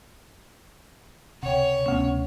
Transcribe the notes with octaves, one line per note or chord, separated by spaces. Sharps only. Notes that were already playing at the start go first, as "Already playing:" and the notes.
C#2 C3 C#5 F#5 G5
D2 C3 A3 B3 C#4